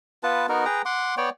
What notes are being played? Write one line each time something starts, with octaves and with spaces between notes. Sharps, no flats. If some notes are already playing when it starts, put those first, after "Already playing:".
B3 F4 B4 A5
B3 D#4 F#4 A#4
G#4 B4 G5 A#5
F#5 C6 D6
B3 C#5 D5 G5